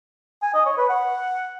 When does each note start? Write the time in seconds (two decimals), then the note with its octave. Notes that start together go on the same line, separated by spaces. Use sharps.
0.42 G#5
0.54 D#5
0.66 C#5
0.78 B4
0.89 F#5